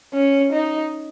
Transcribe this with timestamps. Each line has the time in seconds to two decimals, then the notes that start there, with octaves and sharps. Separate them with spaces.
0.14 C#4
0.52 D#4